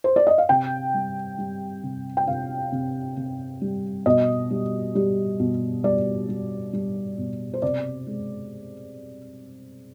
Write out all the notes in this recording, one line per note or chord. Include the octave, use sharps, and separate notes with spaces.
C5
D5
D#5
F5
C3 G5
G3
G3
C3
G5
C3 F5
C3
C3
G3
B2 D#5
G3
G3
B2
G3 D5
G3
G3
B2
C5
C3 D5
G#3